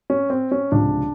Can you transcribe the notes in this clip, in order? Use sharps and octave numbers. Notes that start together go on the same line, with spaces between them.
C#4
C4
C#4
C#2 C3 F3 D4